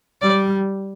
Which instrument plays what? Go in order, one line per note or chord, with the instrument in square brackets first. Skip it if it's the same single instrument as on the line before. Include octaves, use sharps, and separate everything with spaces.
[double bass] G3 [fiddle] D5